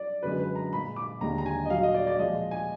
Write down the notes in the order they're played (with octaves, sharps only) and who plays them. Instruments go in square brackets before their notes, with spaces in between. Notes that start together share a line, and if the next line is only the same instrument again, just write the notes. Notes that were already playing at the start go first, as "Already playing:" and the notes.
Already playing: [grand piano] D5
F#2 D3 G#3 B4
B4
A#5
A#2 G#3 B5
D6
D#2 D3 G#3 A#5
A#5
G#5
D#5
A#2 F#3 F5
D#5
D5
D5
A#2 F3 G#3 D#5
G#5